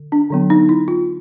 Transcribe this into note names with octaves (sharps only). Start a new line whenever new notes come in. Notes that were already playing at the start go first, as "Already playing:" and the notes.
Already playing: D3
D4
D3 F#3 B3
D#4
E4
F4